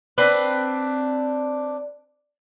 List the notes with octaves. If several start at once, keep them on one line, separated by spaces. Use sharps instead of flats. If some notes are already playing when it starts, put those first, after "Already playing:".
C4 D4 B4